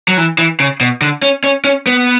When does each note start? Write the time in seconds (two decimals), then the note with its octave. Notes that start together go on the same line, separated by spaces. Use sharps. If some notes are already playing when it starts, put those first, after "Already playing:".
0.08 F#3
0.18 E3
0.38 E3
0.60 C#3
0.81 B2
1.01 D3
1.22 C#4
1.44 C#4
1.65 C#4
1.87 B3